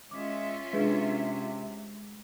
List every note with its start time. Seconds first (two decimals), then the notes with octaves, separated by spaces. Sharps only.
0.11 G#3 C#4 F4 E5 D6
0.73 C3 G#3 D4 G#4 B4